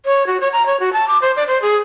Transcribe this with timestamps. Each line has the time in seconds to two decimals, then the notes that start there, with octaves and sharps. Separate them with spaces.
0.06 C#5
0.27 F#4
0.40 C#5
0.53 A#5
0.66 C#5
0.80 F#4
0.93 A5
1.08 D6
1.22 C5
1.36 D5
1.48 C5
1.62 G#4